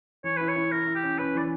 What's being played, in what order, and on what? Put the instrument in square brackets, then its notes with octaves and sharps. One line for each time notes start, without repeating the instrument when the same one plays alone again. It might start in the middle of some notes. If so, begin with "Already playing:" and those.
[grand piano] E3 [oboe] C#5
[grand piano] E4 [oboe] B4
[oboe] C#5
[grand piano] E4
[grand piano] E4 [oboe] A#4
[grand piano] E4
[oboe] G4
[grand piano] C#4
[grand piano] C#4 [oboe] B4
[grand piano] E3 [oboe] D5